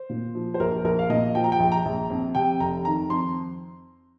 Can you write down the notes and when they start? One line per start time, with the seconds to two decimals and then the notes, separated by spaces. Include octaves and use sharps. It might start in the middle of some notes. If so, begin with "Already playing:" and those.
Already playing: C5
0.09 A#2
0.35 F3
0.54 C5
0.60 A#1 A#4
0.84 A#1 A#4
0.99 F5
1.09 A#2 D#5
1.35 F3 G5
1.44 A#5
1.52 G5
1.60 A#1
1.72 A#5
1.85 A#1
2.10 F2
2.35 C3 G5
2.60 F1 A#5
2.85 D#3 A#5
3.10 F2 C6